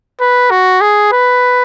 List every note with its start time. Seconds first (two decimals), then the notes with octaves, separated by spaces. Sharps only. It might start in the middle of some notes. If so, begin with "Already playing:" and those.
0.20 B4
0.50 F#4
0.81 G#4
1.12 B4